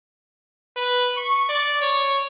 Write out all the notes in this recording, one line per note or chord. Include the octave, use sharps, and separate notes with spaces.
B4
C#6
D5
C#5